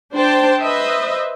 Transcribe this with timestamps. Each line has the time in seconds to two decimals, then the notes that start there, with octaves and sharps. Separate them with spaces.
0.14 D4 C5 G5 A5
0.61 B4 C5 D#5 E5